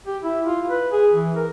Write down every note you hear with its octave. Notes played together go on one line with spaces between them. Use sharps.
G4
E4
F4
B4
G#4
E3
A#4